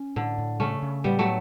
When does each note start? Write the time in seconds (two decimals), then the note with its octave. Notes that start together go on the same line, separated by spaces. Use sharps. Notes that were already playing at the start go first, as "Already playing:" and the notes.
Already playing: C#4
0.16 A2 D3
0.38 A2
0.60 C#3 A3 C#4
0.82 C#3
1.04 A2 G3 B3
1.19 F#3 A3